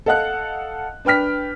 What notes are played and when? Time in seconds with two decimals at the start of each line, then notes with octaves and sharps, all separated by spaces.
0.06 A4 D#5 F5 F#5 F#6
1.05 D4 B4 G5 F6 B6